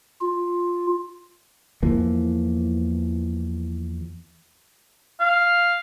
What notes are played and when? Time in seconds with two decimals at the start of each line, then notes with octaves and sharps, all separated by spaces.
0.21 F4
1.83 E2 E3 F3 A#3
5.20 F5